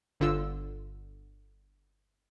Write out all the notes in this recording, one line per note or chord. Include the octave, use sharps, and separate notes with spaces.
G1 D3 F4 E6